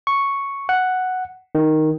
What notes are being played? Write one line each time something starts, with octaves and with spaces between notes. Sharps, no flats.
C#6
F#5
D#3